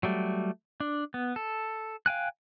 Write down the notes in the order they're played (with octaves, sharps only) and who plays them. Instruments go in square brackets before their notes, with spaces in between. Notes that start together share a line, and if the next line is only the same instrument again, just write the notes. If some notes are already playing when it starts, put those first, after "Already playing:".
[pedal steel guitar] F#3 G3 A3
D4
B3
A4
F5 G5 G#5 F#6